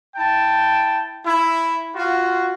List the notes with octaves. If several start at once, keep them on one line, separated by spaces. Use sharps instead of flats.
E4 G5 A5
E4
F4 F#4